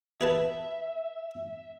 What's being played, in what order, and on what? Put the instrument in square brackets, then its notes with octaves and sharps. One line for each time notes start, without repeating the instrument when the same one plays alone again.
[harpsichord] G#4 B4 A5 [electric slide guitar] E5